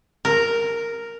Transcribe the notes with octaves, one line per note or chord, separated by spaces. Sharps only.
A#4